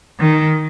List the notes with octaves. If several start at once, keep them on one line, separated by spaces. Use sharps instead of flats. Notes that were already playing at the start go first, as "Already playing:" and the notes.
D#3